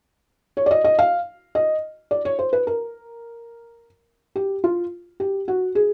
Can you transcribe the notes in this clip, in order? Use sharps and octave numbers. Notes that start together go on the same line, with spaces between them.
C#5
D5
D#5
D#5
F5
D#5
D5
C#5
C5
B4
A#4
G4
F4
G4
F#4
G#4